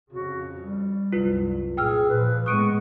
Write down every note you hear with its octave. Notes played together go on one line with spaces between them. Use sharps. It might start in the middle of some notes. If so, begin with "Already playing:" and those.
F2 C#3 F#4
G3
C2 F#2 F4 B4
A#2 G#4 G5 E6 F6
A#2 F3 B4
A2 G#3 B3 C#6 D#6 F#6 D7 D#7